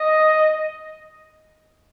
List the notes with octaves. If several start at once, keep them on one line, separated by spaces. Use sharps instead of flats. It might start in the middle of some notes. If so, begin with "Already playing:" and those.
Already playing: D#5